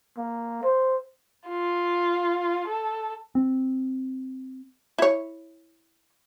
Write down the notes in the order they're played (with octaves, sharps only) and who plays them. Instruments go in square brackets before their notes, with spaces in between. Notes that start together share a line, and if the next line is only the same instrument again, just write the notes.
[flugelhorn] A#3
C5
[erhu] F4
A4
[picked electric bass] C4
[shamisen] E4 C#5